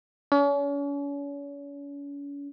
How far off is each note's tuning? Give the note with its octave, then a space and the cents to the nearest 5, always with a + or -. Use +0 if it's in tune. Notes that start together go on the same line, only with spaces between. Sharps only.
C#4 +40